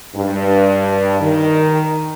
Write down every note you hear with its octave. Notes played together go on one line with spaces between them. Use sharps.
G2
D#3